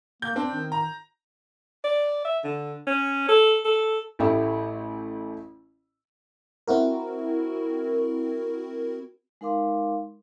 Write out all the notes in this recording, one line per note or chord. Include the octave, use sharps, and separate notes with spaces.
A#3 G6
C4 D4
D#3
A#5
D5
E5
D3
C#4
A4
A4
A1 A3 E4 G4
C4 E4 F#4 A#4
G#3 D#4 A#4 F5 C6 D6